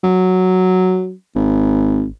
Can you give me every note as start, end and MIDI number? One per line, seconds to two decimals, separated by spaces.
0.04 1.13 54
1.35 2.07 32